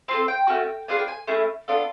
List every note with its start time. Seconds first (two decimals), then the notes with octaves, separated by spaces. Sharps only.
0.08 C4 F4 A4 C6
0.28 G5
0.47 A3 C#4 F#4
0.88 B3 D4 F4 G#4 G#5
0.99 G5
1.08 G#5
1.27 A3 C#4 E4 G#4
1.68 B3 D4 F4 A4